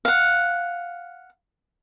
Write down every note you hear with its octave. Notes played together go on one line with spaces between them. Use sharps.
F5 F#5